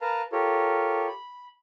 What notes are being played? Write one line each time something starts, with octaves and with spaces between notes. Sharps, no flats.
A#4 B4 F5 A5 A#5
F4 G4 A4 A#4 C#5
B5